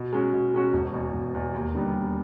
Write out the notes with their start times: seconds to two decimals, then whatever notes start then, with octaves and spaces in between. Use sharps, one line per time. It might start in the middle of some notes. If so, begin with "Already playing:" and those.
Already playing: B2
0.13 G#3 C#4 F#4
0.34 B2
0.54 G#3 C#4 F#4
0.73 E1
0.93 E2 B2
1.13 E1
1.34 E2 B2
1.54 D#2
1.74 D3 G3 B3 D#4
1.94 D#2